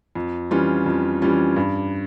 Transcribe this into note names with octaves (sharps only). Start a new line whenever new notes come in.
F2
E3 G3 C#4 F4
F2
E3 G3 C#4 F4
G2